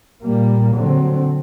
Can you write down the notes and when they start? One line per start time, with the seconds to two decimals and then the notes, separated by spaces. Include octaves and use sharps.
0.23 A#2 G3 A#3
0.75 D3 F#3 C4